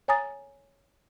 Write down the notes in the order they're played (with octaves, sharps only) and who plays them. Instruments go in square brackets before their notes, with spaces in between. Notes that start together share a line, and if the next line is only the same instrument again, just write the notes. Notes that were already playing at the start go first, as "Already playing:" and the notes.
[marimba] C#5 G#5 A#5 D#6 A6